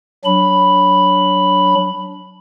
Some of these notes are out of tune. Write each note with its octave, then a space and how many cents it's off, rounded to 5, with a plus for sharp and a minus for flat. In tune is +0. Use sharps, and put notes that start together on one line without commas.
F#3 +0 D4 -20 B5 +0